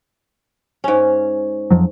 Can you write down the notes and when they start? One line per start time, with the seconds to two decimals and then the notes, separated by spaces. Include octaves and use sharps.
0.84 G#2 C#4
1.70 F2 F3 F#3